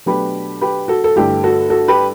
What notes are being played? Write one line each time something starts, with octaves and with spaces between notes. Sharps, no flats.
B2 F#3 A3 D4 G4 B4
G4 B4
F#4 A4
A4
G2 D3 A3 E4 G4
F#4 A4
F#4 A4
G4 B4